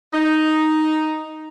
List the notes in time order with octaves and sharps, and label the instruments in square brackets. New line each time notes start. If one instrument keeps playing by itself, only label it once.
[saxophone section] D#4